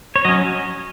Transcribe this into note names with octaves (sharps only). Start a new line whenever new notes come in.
C#5
F#3 C#4 D#5